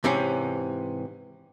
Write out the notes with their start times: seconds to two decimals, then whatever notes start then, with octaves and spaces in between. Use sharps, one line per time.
0.04 G#2 C3 E3 C#4